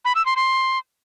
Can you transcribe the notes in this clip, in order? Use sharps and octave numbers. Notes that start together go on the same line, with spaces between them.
B5
E6
C6
C6